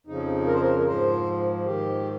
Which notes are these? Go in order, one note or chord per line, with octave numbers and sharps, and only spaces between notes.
F2 C#3 F3 D#4
A#4
C5
A#4
A#4
G#2 F3 C5
G#2 D#3 G4